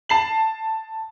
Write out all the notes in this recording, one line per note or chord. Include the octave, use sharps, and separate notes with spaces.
A5 C7 F#7